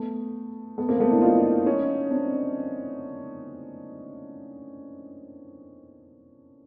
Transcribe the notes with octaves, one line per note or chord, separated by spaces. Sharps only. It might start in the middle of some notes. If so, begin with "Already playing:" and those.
Already playing: A3 B3
A3 B3
A#3 C4
A3 B3
D4 E4
D#4 F4
C#4 D#4
C4 D4